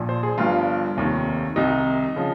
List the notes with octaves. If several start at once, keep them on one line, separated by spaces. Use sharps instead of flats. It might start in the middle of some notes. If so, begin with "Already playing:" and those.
Already playing: A#1 A#2 F3
C5
G#4
G1 G2 F3 F4
F1 D#2 D#3
C2 C3 D#3 D#4
C#3 F3